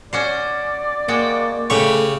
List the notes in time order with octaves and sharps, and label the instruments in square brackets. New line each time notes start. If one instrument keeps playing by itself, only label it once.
[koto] C#4 F#4 C5 [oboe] D5
[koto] G#3 F#4 G5 [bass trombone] A#3
[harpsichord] C#3 C#6 [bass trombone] A3 [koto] G4 B4 G5